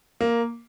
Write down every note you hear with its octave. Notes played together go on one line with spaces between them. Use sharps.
A#3